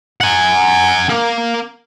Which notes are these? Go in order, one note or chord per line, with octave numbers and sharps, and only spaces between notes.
F#5 G#5
A#3